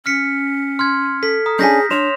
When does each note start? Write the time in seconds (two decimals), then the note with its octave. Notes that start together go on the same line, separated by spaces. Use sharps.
0.06 C#4 F6 B6 C#7
0.79 C6 F6 G#6
1.23 A4 B6
1.46 A#5 D#6
1.59 C#4 D4 G#4 G#5 G6 A#6 B6
1.91 D4 C#5 C6 F6 E7 F7